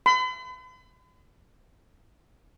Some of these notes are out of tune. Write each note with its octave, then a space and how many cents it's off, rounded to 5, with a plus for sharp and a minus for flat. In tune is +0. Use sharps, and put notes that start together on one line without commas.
B5 +45